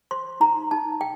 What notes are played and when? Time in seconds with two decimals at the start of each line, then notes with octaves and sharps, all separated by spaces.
0.11 C5 C6
0.40 D#4 A#5
0.71 D#4 A5
1.01 G5